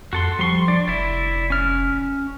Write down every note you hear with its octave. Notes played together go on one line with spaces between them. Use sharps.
F2 F#4 A4 C6
F3 G3 C6 C#6
D4 D5
F1 E4 D5
C#4 F6